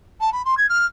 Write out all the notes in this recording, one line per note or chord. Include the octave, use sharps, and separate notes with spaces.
A5
B5
C6
G#6
F6